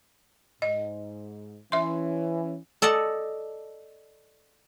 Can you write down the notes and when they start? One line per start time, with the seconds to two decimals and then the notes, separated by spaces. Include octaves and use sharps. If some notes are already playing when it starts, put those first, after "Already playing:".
0.62 G#2 D#5
1.72 E3 C#4 E5 C6
2.82 A4 D5 D#5 F#5 A5